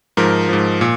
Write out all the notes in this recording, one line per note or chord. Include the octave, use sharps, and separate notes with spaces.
G#2 F3 A#4
G#2 F3
A#2